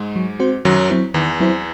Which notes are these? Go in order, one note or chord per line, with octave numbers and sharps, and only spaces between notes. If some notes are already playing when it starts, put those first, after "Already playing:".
Already playing: G#2 G#3
F#3
C4 F#4 C5
F#2 D#3 F#3
F#3 C4 E4 C5
E2 D#3 E3
F#3 C4 E4 C5